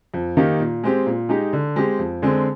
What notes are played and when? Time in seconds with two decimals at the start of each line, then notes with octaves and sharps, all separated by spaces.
0.14 F2
0.37 D#3 A#3 D#4 G4
0.60 A#2
0.84 G#3 C4 G4
1.06 A#2
1.29 G#3 D#4 G4
1.53 D3
1.76 G#3 C4 G4
1.99 F2
2.22 D3 G#3 C4